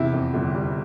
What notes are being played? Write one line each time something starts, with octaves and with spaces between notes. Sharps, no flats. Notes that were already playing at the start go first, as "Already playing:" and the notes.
Already playing: E2 C3 E4
F2
G1
G3